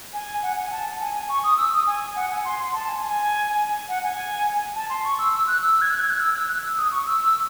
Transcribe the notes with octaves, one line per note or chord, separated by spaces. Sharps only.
G#5
F#5
G#5
A5
G#5
G#5
C#6
D#6
E6
D#6
G#5
F#5
G#5
C6
C6
A5
G#5
G#5
F#5
G#5
A5
C6
C#6
E6
E6
F#6
E6
G#6
F#6
G#6
F#6
E6
E6
F#6
E6
D#6
C#6
E6
E6